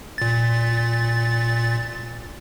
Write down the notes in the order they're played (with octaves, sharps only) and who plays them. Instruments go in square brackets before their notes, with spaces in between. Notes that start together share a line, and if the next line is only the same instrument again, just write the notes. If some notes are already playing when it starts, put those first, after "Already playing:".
[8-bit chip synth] A#2 A6